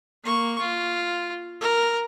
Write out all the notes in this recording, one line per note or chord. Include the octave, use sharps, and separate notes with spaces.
A#3 C#6
F4
A#4